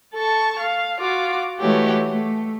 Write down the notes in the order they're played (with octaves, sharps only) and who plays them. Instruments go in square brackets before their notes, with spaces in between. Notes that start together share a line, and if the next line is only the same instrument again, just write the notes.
[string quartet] A4 A5 C#6
F5
F4 F#4 D6
E3 G#3 A3 F#4 G4 C#5
A3